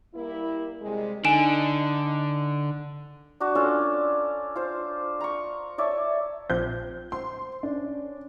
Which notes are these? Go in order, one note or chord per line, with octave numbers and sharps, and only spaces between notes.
G3 A#3 E4
C3 G3 G#3
D3 D#4 G#5 D7 E7
D4 F#4
C#4 D4 F4 A4
F4 C5
A#5 C#6
C#5 D5 E5 A5
A#1 F3 C4 G6
C5 C6
C#4 D4